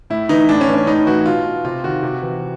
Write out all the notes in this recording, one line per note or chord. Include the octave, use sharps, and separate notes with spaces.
A2 E4
E3 D#4
A2 D4
C#4
E3
C#4
A2 D#4
E3 F#4
B2 F4
C3 F4
D#3 F#4
C3
E3